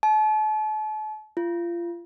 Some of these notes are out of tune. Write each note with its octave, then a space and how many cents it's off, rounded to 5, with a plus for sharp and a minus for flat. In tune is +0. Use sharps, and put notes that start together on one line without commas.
A5 -40
F4 -30